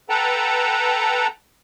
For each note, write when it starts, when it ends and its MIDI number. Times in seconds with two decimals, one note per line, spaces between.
0.09 1.27 69
0.09 1.27 71
0.09 1.27 78
0.09 1.27 79
0.09 1.27 81
0.09 1.27 82